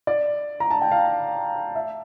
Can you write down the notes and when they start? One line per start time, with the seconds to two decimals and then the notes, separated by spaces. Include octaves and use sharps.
0.07 D5
0.60 A#5
0.71 A5
0.82 G5
0.91 F5
1.75 E5